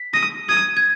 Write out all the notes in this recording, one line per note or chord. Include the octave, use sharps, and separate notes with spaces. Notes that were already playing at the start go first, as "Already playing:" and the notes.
Already playing: B6
D#6 A#6
D#6 G#6
G#6